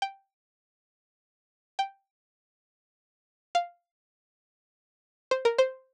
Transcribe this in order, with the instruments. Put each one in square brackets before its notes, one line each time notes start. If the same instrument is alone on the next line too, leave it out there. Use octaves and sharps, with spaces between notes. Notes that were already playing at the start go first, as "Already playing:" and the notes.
[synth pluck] G5
G5
F5
C5
A#4
C5